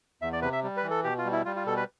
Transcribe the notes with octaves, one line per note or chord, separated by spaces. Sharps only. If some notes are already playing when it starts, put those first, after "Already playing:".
E2 E5
D5
C3 B4
E5
G3
B4
E3
A4
B2 G4
F4
G3
E4
G3 F4
F4
B2 A4
B4